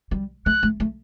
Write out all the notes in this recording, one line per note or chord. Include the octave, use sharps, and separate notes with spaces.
G3
A3 F#6
A3
A3